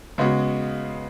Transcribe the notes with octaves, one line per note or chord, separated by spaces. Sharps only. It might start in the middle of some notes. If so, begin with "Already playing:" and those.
C#3 G#3 B3 F#4